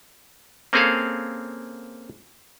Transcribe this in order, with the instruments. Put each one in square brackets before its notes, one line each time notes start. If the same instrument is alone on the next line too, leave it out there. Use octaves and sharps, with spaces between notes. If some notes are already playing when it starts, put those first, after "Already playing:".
[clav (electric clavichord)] A#3 C4 C#4 G#4 A4 F5